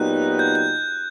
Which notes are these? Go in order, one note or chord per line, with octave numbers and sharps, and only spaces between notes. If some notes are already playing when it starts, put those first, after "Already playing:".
Already playing: A#2 F#3 B3 D#4 G4 F#6
G6
G6